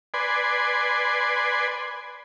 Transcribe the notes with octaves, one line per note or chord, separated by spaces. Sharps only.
B4 D5 G#5 C6